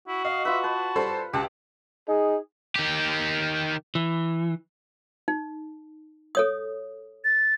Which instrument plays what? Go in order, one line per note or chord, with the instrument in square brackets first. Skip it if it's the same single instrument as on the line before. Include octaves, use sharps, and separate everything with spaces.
[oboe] E4 [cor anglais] F#4
[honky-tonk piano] D#5 [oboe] F5
[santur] F4 B4 [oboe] E5
[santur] B4 [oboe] A5
[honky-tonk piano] G3 A4 C5
[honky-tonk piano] C#2 A5 [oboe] F#4 [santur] G4
[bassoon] D#4 [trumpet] G#4
[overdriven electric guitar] D#3 G4
[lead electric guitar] E3
[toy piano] D#4
A4 C#5 D#6
[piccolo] A6